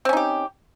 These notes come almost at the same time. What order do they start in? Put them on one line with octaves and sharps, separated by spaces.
C4 C#4 D#4 G4